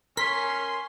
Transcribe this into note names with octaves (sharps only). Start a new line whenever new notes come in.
C#4 A#4 G#5 C6 B6